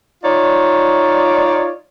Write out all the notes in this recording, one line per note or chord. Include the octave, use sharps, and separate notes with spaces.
D#4 F4 C#5 D5